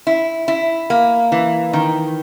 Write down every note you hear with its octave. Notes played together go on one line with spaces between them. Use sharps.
E4
E4
A#3
E3
D#3